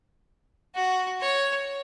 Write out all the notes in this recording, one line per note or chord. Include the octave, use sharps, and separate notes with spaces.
F#4
C#5